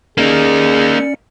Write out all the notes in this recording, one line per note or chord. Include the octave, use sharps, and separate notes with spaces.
A#3 C#4 D#4 G#4 D5 C#7